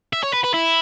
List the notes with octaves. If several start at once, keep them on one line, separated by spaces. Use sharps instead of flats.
E5
C#5
B4
B4
E4